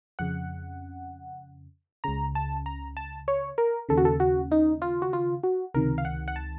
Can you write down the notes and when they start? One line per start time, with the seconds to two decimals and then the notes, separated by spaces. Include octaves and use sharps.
0.19 F2 C#3 F#5
2.04 C#2 C#3 A#5
2.35 A5
2.66 A#5
2.97 A5
3.28 C#5
3.58 A#4
3.89 D#2 C#3 A4
3.97 F#4
4.05 A4
4.20 F#4
4.51 D#4
4.82 F4
5.02 F#4
5.13 F4
5.43 F#4
5.74 C#2 C3 D#3 A#4
5.98 F5
6.05 F#5
6.28 F#5
6.36 A5